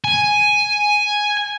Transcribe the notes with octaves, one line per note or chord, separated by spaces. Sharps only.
G#5